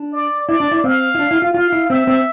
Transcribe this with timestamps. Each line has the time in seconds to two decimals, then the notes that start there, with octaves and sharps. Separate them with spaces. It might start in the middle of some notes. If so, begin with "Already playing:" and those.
Already playing: D4
0.13 D5
0.48 E4 D5
0.60 D4
0.71 E4
0.84 C4 F5
1.15 E4
1.19 D4
1.31 E4
1.42 F4
1.54 F4 F5
1.72 E4
1.90 C4 E5
2.07 C4